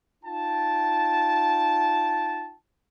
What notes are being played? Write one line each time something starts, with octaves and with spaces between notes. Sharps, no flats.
D#4 F4 G5 A5